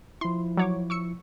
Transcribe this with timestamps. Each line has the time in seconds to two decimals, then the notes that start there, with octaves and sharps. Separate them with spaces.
0.21 F3 E4 C6
0.57 F#3 C#5 D6
0.90 C#6 E6 C#7